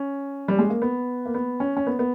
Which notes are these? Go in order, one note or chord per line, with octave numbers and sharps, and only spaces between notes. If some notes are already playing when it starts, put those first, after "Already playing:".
Already playing: C#4
G3
G#3
A#3
B3
A#3
B3
C#4
C#4
B3
B3